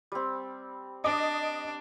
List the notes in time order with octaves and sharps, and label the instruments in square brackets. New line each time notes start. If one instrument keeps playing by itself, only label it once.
[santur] G3 C4
[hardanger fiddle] D4 [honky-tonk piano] D#5 [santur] D6